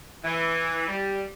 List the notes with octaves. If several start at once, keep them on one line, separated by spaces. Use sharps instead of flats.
E3
G3